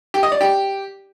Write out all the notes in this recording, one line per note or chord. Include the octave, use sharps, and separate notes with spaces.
G4
D#5
D5
G4